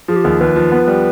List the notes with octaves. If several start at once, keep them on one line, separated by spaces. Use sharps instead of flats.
F3 G#4
G4
D#2 G#4
D#2 B4
F3
B3
G3